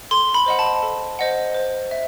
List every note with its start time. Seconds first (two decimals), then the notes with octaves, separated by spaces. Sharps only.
0.11 A4 C6
0.34 B5
0.46 C5 D#5 F#5
0.59 A5
0.82 A4
1.19 C5 D#5 F#5
1.55 C5
1.91 E5